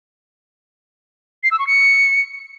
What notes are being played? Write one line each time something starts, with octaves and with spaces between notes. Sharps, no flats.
C7
E6
C#6
C#7